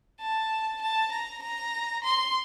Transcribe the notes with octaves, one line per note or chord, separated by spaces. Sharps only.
A5
A5
A#5
A#5
C6